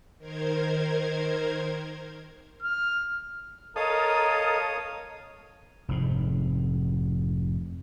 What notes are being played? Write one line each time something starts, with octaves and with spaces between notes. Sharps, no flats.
D#3 A#4 C5 G#6
F6
A4 A#4 C#5 D#5 F5 D#6
F1 G#2